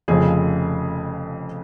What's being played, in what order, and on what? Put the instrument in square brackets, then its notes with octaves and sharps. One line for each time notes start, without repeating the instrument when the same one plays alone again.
[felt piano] F1 F2 C#3 F3 G#4